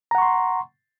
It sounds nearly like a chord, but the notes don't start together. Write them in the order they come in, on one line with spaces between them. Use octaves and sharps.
A#5 F#5 C#6 C6